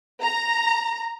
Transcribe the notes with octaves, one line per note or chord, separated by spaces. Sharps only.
A#5